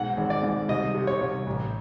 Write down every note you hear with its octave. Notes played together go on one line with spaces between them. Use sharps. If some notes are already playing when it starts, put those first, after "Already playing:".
Already playing: B1 G#2 F#5
G#1
D5
G#2
C2 D#5
C3
C#5
C2
A1